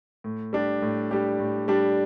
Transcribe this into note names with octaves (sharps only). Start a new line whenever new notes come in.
A2
G3 D4 G4
A2
G3 D4 G4
A2
G3 D4 G4